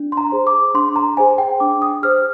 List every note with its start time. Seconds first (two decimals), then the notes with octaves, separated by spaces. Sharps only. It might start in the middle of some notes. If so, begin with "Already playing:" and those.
Already playing: D4
0.12 C6
0.17 A#5
0.32 G#4 C5
0.47 D6
0.74 D4 C6
0.96 A#5
1.17 G#4 C5 G#5
1.38 G5
1.60 D4 D6
1.82 D#6
2.03 G#4 C5 F6